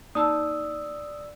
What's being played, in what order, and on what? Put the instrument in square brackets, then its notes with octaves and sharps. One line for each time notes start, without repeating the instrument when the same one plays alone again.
[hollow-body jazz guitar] A#3 D#4 A5 [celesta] D5 E6 [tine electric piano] D#6